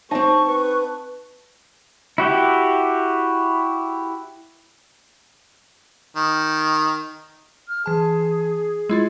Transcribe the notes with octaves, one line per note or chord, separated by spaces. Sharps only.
C4 D#4 A5 C#6
B4
E4 F#4 G4
D#3
F6
E3 G#4 A5
G#3 E4 F4